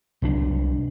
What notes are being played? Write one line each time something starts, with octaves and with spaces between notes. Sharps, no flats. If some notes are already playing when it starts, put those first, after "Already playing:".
C2 F#3 D4